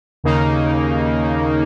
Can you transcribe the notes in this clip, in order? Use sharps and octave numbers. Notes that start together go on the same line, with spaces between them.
D#2 C#3 A#3 D#4